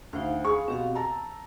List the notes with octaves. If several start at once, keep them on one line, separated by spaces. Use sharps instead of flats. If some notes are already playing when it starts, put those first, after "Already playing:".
D2 D#4 C5 F5
G#4 F5 B5 C#6
B2 C4 G4 F5
A5 A#5 E6